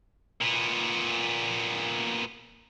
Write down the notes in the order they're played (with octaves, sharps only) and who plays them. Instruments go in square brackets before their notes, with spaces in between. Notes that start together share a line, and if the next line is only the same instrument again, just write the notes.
[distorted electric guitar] A#2 B3